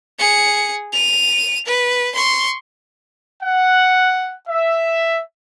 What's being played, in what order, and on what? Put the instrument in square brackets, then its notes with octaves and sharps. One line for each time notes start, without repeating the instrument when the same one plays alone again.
[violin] G#4 C#7
D#7 F7
B4
C6 C#6
[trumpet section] F#5
E5